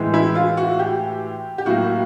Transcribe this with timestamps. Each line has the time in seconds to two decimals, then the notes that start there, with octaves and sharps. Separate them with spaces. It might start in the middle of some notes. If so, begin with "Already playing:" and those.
Already playing: A2 E3 G#3
0.14 E4
0.35 F4
0.57 F#4
0.79 G4
1.58 G4
1.66 A2 F#3 A#3 F#4